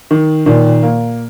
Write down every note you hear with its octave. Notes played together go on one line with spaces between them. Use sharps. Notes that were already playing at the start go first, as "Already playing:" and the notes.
D#3
A#2 D#3
A#3